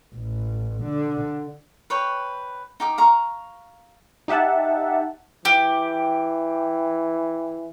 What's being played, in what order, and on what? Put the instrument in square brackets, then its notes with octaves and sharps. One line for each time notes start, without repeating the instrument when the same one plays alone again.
[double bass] A1
D3
[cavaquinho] B4 C#5 G5
D#4 G4 D6
F5 A#5 C#6
[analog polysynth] D#4 G4 E5 F#5 A5
[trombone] E3 [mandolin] G4